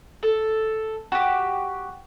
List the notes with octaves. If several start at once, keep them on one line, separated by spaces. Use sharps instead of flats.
A4
F#4 G4